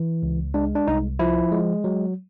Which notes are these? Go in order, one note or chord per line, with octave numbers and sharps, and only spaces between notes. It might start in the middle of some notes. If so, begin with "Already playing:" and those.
Already playing: E3
C#2
G#3 D4
D4
C2 D#4
F3 E4
G#3
F#3